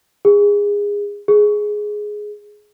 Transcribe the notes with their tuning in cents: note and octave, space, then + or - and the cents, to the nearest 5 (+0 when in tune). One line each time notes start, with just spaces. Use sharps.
G#4 -20
G#4 +5